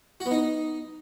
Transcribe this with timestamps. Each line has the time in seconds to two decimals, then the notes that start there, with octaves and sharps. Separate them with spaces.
0.20 F#4
0.26 B3
0.31 D#4